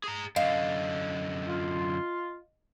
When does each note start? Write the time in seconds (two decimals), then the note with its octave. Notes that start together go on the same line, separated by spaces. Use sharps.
0.04 G#4 A#5
0.36 F#2 D3 D#5 F5
1.47 F4